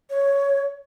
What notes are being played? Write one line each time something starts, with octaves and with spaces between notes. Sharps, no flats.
C#5